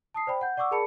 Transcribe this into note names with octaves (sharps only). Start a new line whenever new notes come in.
A5 D#6 C7
C5 D5 G5 B5
F#5 G6
D5 F#5 C#6 D6 E6
G#4 A#4 D5 A5 B5 C#7